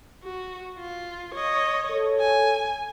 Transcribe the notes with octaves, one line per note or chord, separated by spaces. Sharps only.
F#4
F4
C#5 D#5
A4 C#5
G#5